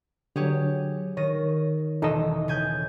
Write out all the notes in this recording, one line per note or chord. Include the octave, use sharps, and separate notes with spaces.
D3 F#3 G4 G#4 C#5
D#3 C#5 A#6 D#7
E1 D#4 A4 D#5 E6
C#3 G#5 G6